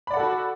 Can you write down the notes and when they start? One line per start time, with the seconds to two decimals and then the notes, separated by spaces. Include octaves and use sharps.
0.07 B5
0.10 D5
0.14 F#5
0.17 A4
0.20 F#4